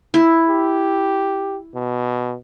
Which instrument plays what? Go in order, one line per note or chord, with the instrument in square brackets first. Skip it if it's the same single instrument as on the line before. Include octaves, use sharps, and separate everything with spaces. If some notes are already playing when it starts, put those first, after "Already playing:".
[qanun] E4
[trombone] G4
B2